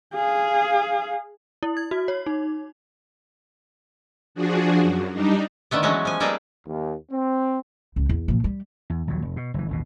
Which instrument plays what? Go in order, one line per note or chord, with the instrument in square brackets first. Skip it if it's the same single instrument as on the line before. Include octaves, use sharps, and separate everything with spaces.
[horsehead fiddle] G#4 F5
[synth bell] E4
G#6
F#4
C#5
D#4
[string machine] F3 D4 F#4 G#4
F#2
G3 D4 D#4
[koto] D3 D#3 A3 B3
E3 F#3 G#3 A3 C#4
F3 G#5
G3 A#3 D#4 G#4 A4 B4
[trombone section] D#2
C4
[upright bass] C#2
E2
A#2 F3
G3
[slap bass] E2
A#1 D#2 A#2 F#3
F1
B2
F#1 E3
A1 D#2 B2